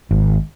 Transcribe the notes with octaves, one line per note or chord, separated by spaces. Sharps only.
G#1